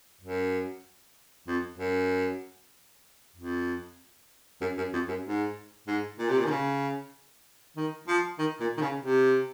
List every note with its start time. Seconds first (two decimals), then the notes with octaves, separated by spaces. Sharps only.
0.21 F#2
1.47 F2
1.78 F#2
3.36 F2
4.61 F#2
4.78 F#2
4.93 F2
5.09 F#2
5.25 G#2
5.88 G#2
6.19 A#2
6.29 C3
6.38 A#2
6.45 D#3
6.50 C#3
7.77 D#3
8.08 F3
8.39 D#3
8.60 A#2
8.77 D#3
8.82 C#3
9.02 C3